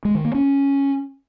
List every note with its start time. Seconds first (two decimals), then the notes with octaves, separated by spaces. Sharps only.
0.05 G#3
0.15 D#3
0.25 A#3
0.35 C#4